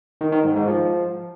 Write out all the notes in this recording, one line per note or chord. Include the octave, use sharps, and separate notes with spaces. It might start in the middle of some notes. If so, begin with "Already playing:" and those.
D#3
D#3
G#2
G#2
F3